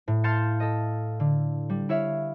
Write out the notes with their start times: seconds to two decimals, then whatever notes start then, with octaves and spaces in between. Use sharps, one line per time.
0.08 A2
0.24 F5 A5 C6 G6 A6 C#7
0.60 A4 D#5
1.20 D3
1.69 G3
1.89 E4 C#5 E5 F5